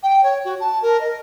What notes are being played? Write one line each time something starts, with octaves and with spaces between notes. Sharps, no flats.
G5
C#5
F#4
A5
A#4
D#5